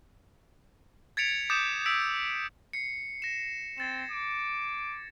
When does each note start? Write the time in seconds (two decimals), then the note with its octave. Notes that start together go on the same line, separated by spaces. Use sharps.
1.17 G#6 A6 B6 C#7 D7 F7
1.50 D6 D#6 G6 A6 C#7 E7
1.86 E6 B6 D7
2.73 C7 C#7
3.22 A#6 E7
3.78 C4 G#6 A6 E7
4.11 D6